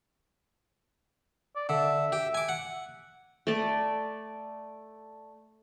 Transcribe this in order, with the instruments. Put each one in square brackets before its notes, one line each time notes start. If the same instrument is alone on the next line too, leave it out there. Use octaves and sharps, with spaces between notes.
[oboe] D5
[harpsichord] D3 [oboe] E5
[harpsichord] G4
G#5 D6
F#5
[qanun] A3 D5